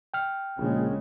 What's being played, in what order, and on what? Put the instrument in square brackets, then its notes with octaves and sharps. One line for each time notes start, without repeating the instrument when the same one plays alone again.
[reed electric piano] G5 F6
[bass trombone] A#1 [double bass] C#3 G#3